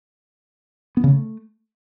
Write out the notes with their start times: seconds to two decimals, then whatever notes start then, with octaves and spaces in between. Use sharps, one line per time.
0.97 B3
1.04 C#3
1.10 A3